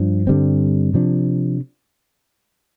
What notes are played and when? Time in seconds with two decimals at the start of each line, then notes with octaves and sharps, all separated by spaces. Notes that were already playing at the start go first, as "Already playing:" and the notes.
Already playing: G2 F3 D4
0.27 G2 D3 G3 C4
0.94 C3 F3 D4